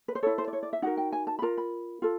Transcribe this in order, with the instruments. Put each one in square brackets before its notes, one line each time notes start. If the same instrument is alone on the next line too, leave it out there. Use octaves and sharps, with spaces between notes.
[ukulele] B4
C5
E4 A4 C#5
C5
D5
C#5
D5
E5
D#4 F#4 A#4 F#5
G5
G#5
A5
B5
F4 A#4 A#5
B5
F4 A4